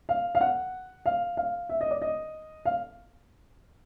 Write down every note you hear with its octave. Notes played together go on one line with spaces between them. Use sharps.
F5
F5
F#5
F5
F5
E5
D#5
D5
D#5
F5